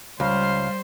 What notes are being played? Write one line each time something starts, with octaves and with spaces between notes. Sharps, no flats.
C#2 G3 C5 F5